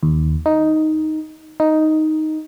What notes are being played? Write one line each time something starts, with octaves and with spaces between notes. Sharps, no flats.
D#2
D#4
D#4